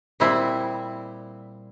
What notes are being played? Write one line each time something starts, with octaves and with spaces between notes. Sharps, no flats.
A#2 G3 C4 E4